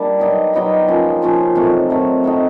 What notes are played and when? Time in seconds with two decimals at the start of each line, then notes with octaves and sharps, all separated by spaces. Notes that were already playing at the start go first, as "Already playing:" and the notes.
Already playing: G3 A#3 D4
0.20 F#3 B3 D#4 G4
0.54 F#3 B3 D#4 G4
0.87 F3 A#3 C#4 F4
1.22 F3 A#3 C#4 F4
1.55 C3 D#3 F#3 A3
1.90 C3 D#3 F#3 A3
2.24 A3 C4 D#4